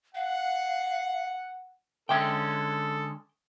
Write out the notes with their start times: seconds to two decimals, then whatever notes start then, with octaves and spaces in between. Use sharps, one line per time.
0.15 F5 F#5
2.09 D3 G#3 C#4 A4 E5 G5